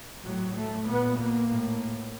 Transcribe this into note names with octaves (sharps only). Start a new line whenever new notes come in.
A2 F#3
A3
A#2 B3
A#3
A2